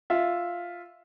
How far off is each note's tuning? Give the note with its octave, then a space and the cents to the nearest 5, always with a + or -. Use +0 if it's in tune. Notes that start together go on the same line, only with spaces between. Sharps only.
F4 +0 E5 +0